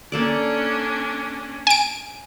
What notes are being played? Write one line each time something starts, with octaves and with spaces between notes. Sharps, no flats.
A#3 C#4 D4 A4 D5
G#5 D7